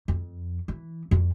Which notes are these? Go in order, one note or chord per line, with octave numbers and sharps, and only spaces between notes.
F2
E3
F2